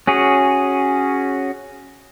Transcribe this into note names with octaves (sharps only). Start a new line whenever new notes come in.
C#4 F#4 G#4